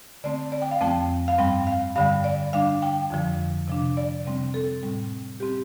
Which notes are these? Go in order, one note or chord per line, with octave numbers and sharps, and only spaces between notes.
D3 A3 C4 D5
D5
G5
F5
F2 F3 A3 C4 G5
F5
G2 G3 C4 G5
F5
G2 D3 G3 F5
D5
D3 G3 D4 F5
G5
F2 D3 F3
C3 F3 D4
D5
C3 G3 C4
A4
A2 G3 C4
G3 C4 G4